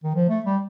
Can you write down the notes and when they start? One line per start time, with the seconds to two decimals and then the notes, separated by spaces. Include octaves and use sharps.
0.04 D#3
0.15 F3
0.29 A3
0.46 G3